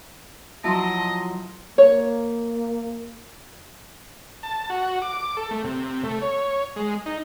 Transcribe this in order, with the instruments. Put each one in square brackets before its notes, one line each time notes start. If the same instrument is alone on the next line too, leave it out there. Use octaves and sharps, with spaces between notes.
[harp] F3 F#3 E4 [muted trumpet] D#5 [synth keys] A5 C6
[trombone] A#3 [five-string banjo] C#5
[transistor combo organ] A5
F#4
D6
A4
A3
C3
A3
C#5
G#3
D#4